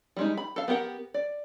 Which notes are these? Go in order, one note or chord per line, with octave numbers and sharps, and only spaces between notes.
G3 G#3 D#4
B5
A4 F5
B3 G4 A#4 F#5
D5